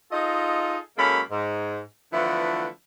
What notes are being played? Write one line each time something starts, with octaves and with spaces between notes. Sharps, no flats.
D#4 F4 G#4 A4 D#5
F#2 G#3 A#3 C#4 A4 B5
G#2
D3 E3 F3 A3 B3 E4